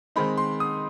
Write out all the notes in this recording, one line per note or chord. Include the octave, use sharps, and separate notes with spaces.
D#3 G#3 C4 D#4 B5
C6
D#6